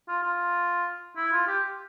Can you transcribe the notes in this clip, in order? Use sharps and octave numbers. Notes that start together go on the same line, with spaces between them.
F4
F4
E4
F4
G4